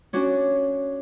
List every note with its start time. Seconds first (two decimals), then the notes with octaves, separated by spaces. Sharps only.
0.13 C#4 D4 F#4